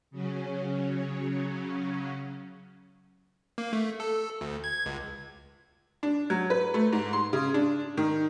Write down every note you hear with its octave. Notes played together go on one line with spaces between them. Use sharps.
C#3 F#3 C#4
A#3
A3
A4
D2
G#6
C#2
D4
F#3
B4
A3
G#2
C6
C#3
D4
D#3